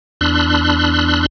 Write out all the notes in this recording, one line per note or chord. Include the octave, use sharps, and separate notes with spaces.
E2 D4 B5 C6 E6 F#6